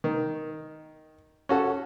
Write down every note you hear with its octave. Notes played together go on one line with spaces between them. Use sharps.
D#3
C#4 F#4 A4